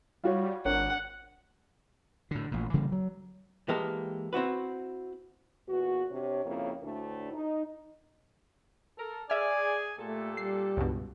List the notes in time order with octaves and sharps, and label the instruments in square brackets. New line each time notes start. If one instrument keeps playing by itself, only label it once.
[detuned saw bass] G3 [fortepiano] F4 F#4 C#5
[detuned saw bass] G#1 [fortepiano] D4 A#4 C#5 [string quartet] F#5
[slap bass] A2 D3
A1 A#2
C#3 E3 G3 A#3
F#3
[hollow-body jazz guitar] E3 G#3 A#3 G4 A4 A#4
C4 E4 F#4 B4
[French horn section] E2 A#2 B3 F#4
C3 D4 C#5
F2 C#3 A#3 E4 C#5
D2 A2 A3 D4
D#4
[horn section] A4 A#4
[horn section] G#4 G#5 [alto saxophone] D5 [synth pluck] E5 F6
[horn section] A#2 G4 A4 [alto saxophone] A3
[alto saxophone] G3 [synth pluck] C7
[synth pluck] C#2 G2 B2